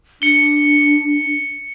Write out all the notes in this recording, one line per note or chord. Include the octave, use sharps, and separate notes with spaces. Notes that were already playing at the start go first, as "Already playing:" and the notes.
D4 C#7 G7